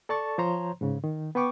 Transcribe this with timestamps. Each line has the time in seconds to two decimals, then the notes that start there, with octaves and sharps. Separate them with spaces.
0.09 A4 D5 A5 C#6 A6
0.38 F3 C5 C#5 A#5 C6
0.81 G#2 C#3
1.04 D#3
1.35 B3 B4 G5 C#6 D6